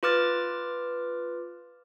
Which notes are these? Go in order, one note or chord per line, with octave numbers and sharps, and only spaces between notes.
F4 B4 D6 F6 A6